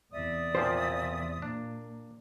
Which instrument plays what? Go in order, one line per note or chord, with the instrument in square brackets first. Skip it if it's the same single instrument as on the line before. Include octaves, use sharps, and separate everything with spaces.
[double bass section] E2 C3 [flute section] D5 E5 D#6
[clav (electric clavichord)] A#2 F3 G4 [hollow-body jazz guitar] C5
[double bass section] A#2 A#3 [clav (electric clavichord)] D4